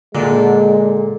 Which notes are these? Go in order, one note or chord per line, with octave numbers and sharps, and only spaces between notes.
A#2 D3 G#3